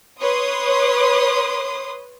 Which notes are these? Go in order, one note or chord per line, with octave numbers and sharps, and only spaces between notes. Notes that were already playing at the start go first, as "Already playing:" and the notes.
B4 C#5 C6 D#6